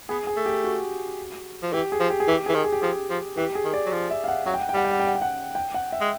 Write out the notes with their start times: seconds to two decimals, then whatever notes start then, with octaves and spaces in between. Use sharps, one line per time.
0.09 B3 G#4
0.27 G#4
0.36 A3
0.46 G4
0.64 F#4
1.63 F3
1.73 E3 G4
1.92 G#4
2.00 F3
2.10 G4
2.20 G#4
2.28 E3 G4
2.46 E3 G#4
2.55 D#3
2.64 G#4
2.72 G4
2.82 F3 G#4
3.10 F3
3.37 E3 G4
3.55 G#4
3.64 D#3
3.74 D5
3.86 F#3
3.92 F3
4.11 E5
4.24 F5
4.28 F#5
4.46 F#3 F#5
4.54 G5
4.61 F#5
4.69 G5
4.74 G3 F#5
4.85 G5
4.91 F#5
5.00 G5
5.07 F#5
5.15 G5
5.22 F#5
5.55 G5
5.74 F#5
5.92 E5
6.01 G#3